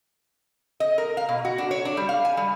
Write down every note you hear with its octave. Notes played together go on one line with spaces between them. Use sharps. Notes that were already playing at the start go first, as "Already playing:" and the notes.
D#5
A#4
F5
B2
F#4
D4
C#5
D4
G3
F5
G#5
G3